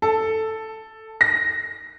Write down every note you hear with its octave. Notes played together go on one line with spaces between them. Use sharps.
A4
A#6